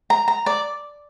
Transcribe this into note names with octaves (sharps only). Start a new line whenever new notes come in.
A#5
A#5
D5